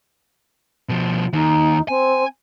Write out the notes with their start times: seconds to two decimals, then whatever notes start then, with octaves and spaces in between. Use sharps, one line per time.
0.89 B2 F3
1.33 D#2 D#4
1.89 C4 G#5